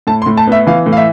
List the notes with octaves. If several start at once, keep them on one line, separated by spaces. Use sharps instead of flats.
A2 A5
C6
A2
A5
B3 E5
E3 F5
A2
F5
E5